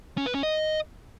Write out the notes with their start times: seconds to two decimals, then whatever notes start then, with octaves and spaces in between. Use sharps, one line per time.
0.17 C#4
0.26 B4
0.35 C#4
0.43 D#5